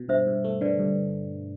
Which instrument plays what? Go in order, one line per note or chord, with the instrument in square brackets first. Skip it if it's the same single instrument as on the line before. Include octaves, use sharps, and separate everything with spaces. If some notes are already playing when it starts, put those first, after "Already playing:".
Already playing: [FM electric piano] B2
[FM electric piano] G2 [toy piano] C5 E5
[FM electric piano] G2
A3
[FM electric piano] D3 [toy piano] B4 D5
[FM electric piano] G2